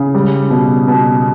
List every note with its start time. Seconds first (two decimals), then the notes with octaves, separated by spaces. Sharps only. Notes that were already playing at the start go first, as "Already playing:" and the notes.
Already playing: C#3
0.15 G3
0.50 B2
0.88 B2